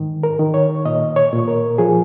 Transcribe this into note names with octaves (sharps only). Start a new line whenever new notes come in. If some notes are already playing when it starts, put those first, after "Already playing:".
Already playing: G#2 D#3
A#4
D#3
C#5
A#2 D#5
C#5
A#2
A#4
F3 G#4